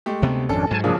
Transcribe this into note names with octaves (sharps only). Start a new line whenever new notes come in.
G#3 A3 G4
D2 C3 B3
G#1 F2 C#4 D4 A4
G#2 F#3 G#5 A5
A#1 C#3 F3 A#3 D4 G#4